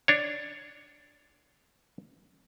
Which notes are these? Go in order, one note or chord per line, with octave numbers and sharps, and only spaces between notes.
D4 C#5